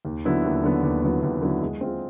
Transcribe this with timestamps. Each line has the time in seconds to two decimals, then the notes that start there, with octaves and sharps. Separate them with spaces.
0.05 D#2
0.25 D3 F#3 B3 E4
0.44 D#2
0.63 D3 F#3 B3 E4
0.83 D#2
1.03 D3 F#3 B3 E4
1.23 D#2
1.42 D3 F#3 B3 E4
1.62 G#3
1.81 C4 F4 G#4